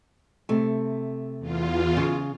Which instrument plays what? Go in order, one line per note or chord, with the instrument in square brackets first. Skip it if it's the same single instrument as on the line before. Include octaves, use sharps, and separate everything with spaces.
[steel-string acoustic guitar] C3 A3
[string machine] E2 F4
[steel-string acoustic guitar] C#3